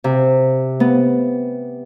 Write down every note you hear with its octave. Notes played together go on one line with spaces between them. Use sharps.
C3
B3